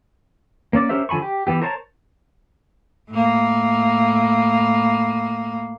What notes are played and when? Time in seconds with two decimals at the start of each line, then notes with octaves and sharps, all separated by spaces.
0.73 A#3 C#4 D5 D6
0.89 C#4 G4 A#4 C5 E5
1.09 D3 F3 G#5 B5 C#6
1.22 G4
1.47 E3 B3 G4
1.62 A#4 C5 C#5 A5 A#5
3.10 A2 A#3